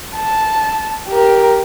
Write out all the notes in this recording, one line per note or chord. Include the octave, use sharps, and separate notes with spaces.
A5
G4 A#4